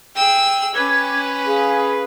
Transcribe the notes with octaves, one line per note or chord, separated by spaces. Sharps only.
G#4 G5 E6
C#4 B4 D6 G#6
G#4 F5